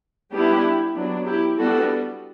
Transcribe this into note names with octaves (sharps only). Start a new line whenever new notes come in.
G3 B3 D4 E4 G4
F#3 B3 D4
E4 G4
G3 B3 D4 F#4 A4